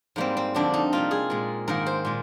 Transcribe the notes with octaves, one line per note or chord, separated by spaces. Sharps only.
G#2 G3 A#3 C4
C4
F2 D3 G3 A#3 D4
D#4
C3 G3 A#3 F4
G#4
A#2 G#3
G#2 D#3 A#3 A#4
C5
A#2 G#3